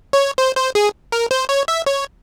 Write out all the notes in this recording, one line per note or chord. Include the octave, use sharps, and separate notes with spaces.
C#5
C5
C5
G#4
A#4
C5
C#5
E5
C#5